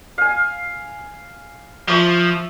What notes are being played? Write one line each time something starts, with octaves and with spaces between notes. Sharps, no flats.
F5 G#5
F3 E5 C#6